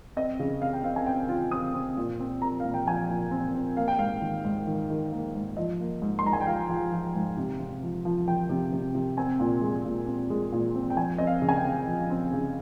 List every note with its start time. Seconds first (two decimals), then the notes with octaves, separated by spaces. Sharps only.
0.16 C4 D#5
0.40 C#3
0.61 C4 F5
0.73 G5
0.84 C4 F5
0.96 G#5
1.06 C4 G5
1.29 F4
1.51 C4 D#6
1.74 C4
1.97 A#2
2.19 C4
2.42 C4 A#5
2.60 A#2 F5
2.74 G5
2.87 F3 G#5
3.09 A#2
3.31 C4
3.55 C4
3.77 A#3 F5
3.88 G5
3.99 G#2 F5
4.22 D#3
4.45 G#2
4.67 D#3
4.90 D#3
5.12 A#3
5.35 G#2
5.57 F3 D#5
5.80 A#3
6.02 G#2
6.19 C6
6.24 G#2 A#5
6.33 G#5
6.41 G5
6.47 F3 F5
6.70 F3
6.92 F3
7.15 G#2
7.37 C3
7.60 C3
7.83 F3
8.05 F3
8.28 F3 G5
8.50 C3
8.73 C3
8.95 C3
9.17 C4 G#5
9.40 A#2
9.62 G#3
9.85 A#2
10.07 C4
10.30 G#3
10.52 A#2
10.75 C4
10.90 G5
10.97 F3 G#5
11.18 C4 D#5
11.27 F5
11.42 C#3
11.49 G#5
11.57 G5
11.65 C4
11.87 F3
12.10 C4
12.33 C#3